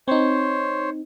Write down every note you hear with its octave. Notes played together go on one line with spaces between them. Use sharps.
C4 D#4 C5 C#5